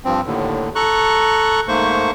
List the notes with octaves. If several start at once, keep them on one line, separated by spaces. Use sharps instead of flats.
G2 F3 C4
D#2 A2 D3
A4 A#5 C#6 F#6
G#2 A3 A#3 C5 C#6